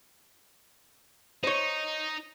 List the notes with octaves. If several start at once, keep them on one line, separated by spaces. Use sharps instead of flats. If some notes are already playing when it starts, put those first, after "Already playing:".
D#4 C5 C#5